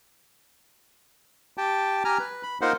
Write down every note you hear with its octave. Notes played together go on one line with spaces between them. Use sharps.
G4 G5 A5
G4 G#5 A#5 F6
B4
B5
A#3 D#4 F4 A#4 C5 F#5